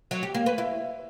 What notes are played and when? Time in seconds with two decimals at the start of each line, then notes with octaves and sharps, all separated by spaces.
0.11 F#3
0.23 G4
0.35 A#3
0.46 B4
0.58 E4